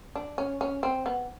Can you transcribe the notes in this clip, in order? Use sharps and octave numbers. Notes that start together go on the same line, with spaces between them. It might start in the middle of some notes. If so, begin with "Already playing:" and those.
D4
C#4
C#4
C4
B3